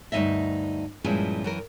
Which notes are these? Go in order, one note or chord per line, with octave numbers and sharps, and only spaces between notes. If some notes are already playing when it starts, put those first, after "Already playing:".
D2 G2 E3 D#4 D#5 E5
G2 A#2 F3 G#3 C#4 E4
F#2 E3 A#4